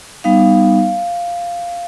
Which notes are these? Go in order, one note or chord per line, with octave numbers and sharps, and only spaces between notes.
G3 B3 D#4 F5